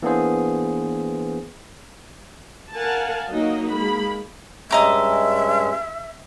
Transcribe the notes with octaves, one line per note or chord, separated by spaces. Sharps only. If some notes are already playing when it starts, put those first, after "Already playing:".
E3 A#3 B3 D4 G#4 C5
A#4 F5 F#5 G#5 A5
F#3 A#3 D#4 F#4 D#5
G#3 A#3 B5
G2 G#3 C#4 D#5 E5 A#5 D6